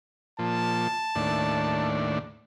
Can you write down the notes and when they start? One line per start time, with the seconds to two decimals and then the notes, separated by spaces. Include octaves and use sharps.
0.39 A#2 F3 A5
1.16 D#2 A2 D4